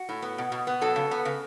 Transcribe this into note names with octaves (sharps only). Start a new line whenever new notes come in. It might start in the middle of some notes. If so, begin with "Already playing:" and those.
Already playing: F#4
A2
B3
B2
B2
B3
F#3 A4
C#3
B3
C#3